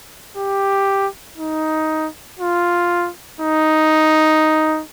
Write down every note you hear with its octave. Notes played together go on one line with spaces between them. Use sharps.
G4
D#4
F4
D#4